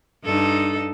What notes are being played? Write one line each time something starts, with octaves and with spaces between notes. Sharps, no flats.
G2 D#4 A4